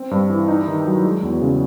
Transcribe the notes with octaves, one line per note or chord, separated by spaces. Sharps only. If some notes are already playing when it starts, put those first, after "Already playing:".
Already playing: C4
G2
E3
D#4
D#3
F#3
G#3
E2
C#3